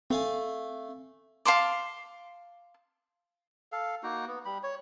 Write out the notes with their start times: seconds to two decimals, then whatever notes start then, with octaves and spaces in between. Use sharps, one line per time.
0.10 A3 C4 F5 G#5
1.45 F5 A5 C6 D6
3.72 A4 F5
4.03 A#3 D#4 F#4
4.27 B3
4.45 G3 B5
4.63 C#5